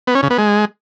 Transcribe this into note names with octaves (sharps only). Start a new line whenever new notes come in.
B3
C#4
C#3
B3
G#3